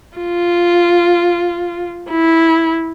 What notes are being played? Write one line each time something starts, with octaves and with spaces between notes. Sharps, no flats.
F4
E4